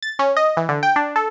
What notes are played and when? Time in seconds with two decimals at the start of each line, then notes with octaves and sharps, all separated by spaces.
0.03 A6
0.19 C#4
0.37 D#5
0.57 E3
0.69 D3
0.83 G5
0.96 D4
1.16 A4